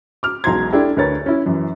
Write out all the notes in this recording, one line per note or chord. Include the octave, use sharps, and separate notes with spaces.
D6 F6
E1 B1 F#4 A#5 C6 G#6
D4 E4 G4 A4
D2 A#4 B4 C#5 A6
C#4 E4
F#2 E3